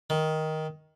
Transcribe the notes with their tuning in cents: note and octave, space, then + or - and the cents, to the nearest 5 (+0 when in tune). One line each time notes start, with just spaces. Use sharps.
D#3 +10